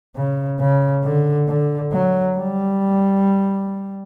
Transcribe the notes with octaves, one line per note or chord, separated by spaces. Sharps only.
C#3
C#3
D3
D3
F#3
G3